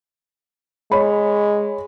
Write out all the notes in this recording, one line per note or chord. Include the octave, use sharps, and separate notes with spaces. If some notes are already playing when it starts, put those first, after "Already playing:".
G#3 C#5 B5